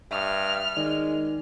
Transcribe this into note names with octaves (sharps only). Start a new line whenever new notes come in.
G2 E5 C#6 D#6 F6
D#3 G#3 D5